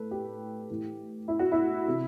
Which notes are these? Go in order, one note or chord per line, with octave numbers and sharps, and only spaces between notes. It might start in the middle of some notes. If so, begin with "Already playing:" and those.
Already playing: A2 A4 B4
G4
A2 E3
E4
F#4
E4
C3 E3